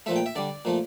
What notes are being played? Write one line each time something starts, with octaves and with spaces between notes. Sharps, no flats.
A#2 F3 A3 E5
G5
E5
D3 G3 D5
A#2 F3 A3